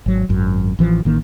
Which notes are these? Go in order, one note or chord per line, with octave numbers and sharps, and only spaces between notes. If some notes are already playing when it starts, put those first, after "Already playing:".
G#1 F#3
G#1 F#2
A1 E3 F3
A1 D#3 A#3